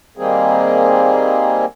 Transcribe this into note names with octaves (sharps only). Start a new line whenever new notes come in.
D#3 G3 A#3 C4 G#4